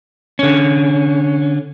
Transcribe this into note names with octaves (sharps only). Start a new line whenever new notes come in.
D3 C#4